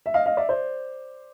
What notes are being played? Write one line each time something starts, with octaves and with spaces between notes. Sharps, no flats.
E5
D#5 F5
D#5 F5
D5 E5
C5 D5